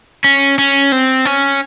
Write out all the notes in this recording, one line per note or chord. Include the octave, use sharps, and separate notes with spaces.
C#4
C#4
C4
C#4